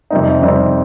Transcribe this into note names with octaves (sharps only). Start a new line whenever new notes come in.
F2 C3 G3 C4 D#4
F2 C3 G3 C4 D#4